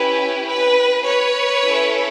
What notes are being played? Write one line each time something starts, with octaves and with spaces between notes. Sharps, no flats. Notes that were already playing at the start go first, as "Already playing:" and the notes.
Already playing: C#4 E4 G4 B4
B4
B4 C#5
C#4 E4 A4